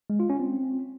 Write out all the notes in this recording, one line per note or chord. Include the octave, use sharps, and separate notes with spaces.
G#3
F4
C#4
C4